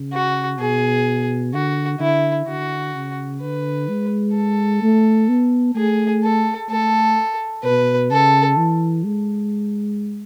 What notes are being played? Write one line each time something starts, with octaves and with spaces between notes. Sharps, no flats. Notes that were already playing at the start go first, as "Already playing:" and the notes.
Already playing: C#3
F#4
B2 G#4
D3 F#4
D3 E4
D3 F#4
C#3
D3 B4
G#3
A4
A3
B3
A3 G#4
A4
A3 A4
B2 B4
C#3 A4
E3
G#3